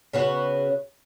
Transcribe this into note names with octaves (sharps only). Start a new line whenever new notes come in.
C#3 B3 F#4